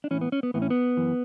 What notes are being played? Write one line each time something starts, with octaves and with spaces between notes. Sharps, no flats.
D4
A2 E3 C#4
B3
C#4
B3
A2 E3 B3
C#4
B3
F#2 E3